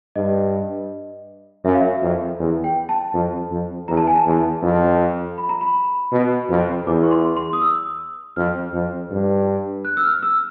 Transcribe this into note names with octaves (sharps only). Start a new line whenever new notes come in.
G2 D#5
F#2 E5
F5
E5
F2
E2
G5
A5
F2
F2
E2 A#5
A5
G#5
A5
E2
F2
B5
A#5
B5
B2
F2
E2 D6
C#6
C6
C6
D#6
E6
F2 F6
F2
G2
F#6
E6
F6
E6